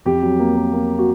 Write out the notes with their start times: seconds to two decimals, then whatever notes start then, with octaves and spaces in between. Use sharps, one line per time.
0.05 F2 G4
0.22 F#3
0.39 A#3
0.56 A#3
0.73 A#3
0.98 F#4